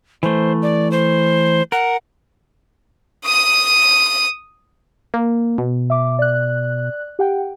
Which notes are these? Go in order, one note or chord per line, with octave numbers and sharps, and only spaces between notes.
E3 A3 C5
D5
C5
A#4 F#5
D#6 D#7
A#3
B2
E5 D6
D5 F#6
G4 F#5 G5